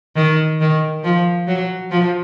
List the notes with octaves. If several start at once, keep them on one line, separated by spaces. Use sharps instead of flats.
D#3
D#3
F3
F#3
F3